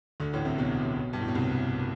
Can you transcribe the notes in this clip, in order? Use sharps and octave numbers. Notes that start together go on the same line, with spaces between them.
D2 D3
A1 A2
C2 C3
B1 B2
G2
A2
B2
C2 C3